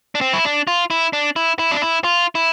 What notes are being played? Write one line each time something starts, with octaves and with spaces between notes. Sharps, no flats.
D4
C4
E4
D4
F4
E4
D4
E4
E4
D4
E4
F4
E4